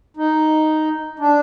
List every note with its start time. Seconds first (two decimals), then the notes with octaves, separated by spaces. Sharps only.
0.17 D#4
1.19 D4